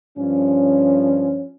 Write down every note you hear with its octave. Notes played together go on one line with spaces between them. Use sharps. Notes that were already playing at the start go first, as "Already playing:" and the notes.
G2 F3 C#4